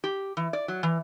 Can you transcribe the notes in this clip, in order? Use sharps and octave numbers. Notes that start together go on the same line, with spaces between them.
G4
E3
D5
F#3
E3